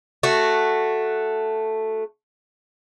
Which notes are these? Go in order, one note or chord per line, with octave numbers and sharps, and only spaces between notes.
A3 F#4